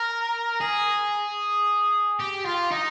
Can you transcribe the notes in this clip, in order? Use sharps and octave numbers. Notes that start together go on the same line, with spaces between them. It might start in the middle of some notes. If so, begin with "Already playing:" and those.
Already playing: A#4
G#4
G4
F4
D#4